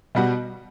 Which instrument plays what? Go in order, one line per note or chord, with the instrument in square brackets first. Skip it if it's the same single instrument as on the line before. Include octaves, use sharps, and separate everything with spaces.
[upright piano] B2 G3 B3 F#4